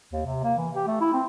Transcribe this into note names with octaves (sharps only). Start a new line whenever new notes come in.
D#2
C3
A#3
E3
G4
A3
E4
C4